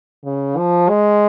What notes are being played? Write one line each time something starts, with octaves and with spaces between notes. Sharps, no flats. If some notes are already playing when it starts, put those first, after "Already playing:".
C#3
F3
G#3